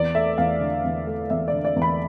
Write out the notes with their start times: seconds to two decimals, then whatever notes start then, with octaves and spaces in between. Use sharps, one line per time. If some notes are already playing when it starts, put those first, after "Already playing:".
Already playing: E2 D5
0.15 A3 E5
0.38 E2 F5
0.61 D3
0.84 E2
1.07 A3
1.30 E2 E5
1.48 D5
1.53 D3
1.65 D5
1.76 E2
1.82 B5